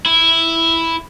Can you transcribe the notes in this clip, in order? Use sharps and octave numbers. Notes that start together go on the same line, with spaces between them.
E4